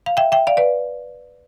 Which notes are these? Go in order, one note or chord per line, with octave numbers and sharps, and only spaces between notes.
F5
E5 G5
E5 G5
D5 F5
B4 D5